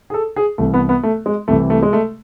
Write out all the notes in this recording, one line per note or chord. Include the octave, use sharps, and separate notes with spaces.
G#4
A4
G#4
C2 C3 E3 A3
B3
B3
A3
G#3
C2 C3 E3 A3
A3
G#3
A3